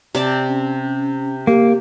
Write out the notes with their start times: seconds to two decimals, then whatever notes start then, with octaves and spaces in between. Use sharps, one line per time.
0.15 C3 D5 A5
0.48 C#4
1.47 A#3 G4